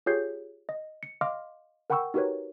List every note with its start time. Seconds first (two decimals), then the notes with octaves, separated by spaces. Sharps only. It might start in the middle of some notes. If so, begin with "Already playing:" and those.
0.06 F4 G4 G#4 C#5 G6 C7
0.69 D#5
1.03 C#7
1.21 D#5 F5 C6 D6 F6
1.90 A#4 F#5 G5 B5 C#6 E6
2.14 D#4 F#4 G4 A#4 B4 C#5